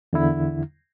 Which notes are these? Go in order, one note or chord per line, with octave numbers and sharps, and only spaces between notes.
E2 D3 E4